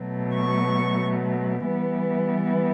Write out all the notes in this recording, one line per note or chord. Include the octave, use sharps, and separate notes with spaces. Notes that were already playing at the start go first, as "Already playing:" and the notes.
Already playing: B2 F#3 A3
C#6
E3 G3 B3